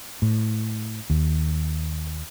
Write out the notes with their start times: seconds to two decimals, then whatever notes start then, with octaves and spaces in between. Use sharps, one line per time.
0.22 A2
1.10 D#2